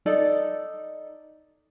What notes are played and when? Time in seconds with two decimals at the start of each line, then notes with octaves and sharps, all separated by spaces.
0.06 D#4 A4 D5